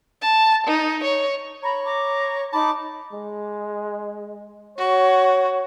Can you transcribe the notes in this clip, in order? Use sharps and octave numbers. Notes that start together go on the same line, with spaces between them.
A5
D#4
C#5
C#5 A#5 B5
A#5 D6
D#4 A5 B5 D6
G#3
F#4 C#5